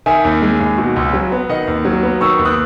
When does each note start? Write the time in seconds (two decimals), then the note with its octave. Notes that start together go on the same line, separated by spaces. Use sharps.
0.06 D#3 E5 G#5
0.24 D#2
0.42 G#3
0.60 D#2
0.78 B2
0.96 C#2
1.13 F#3
1.32 B3
1.49 D#3 D#5 F#5
1.67 D#2
1.85 F#3
2.03 B3
2.21 D#3 C#6 E6
2.39 D#2
2.45 D#6 F#6